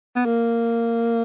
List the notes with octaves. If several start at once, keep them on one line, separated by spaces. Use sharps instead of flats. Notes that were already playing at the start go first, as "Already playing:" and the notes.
B3
A#3